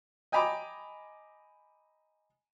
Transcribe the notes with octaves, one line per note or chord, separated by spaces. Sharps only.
D#5 G5 G#5 A#5 B5 D6